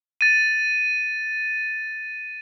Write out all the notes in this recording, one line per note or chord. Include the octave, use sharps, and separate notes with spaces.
A6 D#7